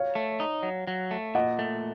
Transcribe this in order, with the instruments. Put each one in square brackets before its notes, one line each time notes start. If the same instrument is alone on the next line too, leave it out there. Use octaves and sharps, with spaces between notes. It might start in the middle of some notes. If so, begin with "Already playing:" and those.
Already playing: [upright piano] C#5 F5
[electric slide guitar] A3
D#4
F#3
F#3
A3
[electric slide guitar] A#2 [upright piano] D#5 F#5
[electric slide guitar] A3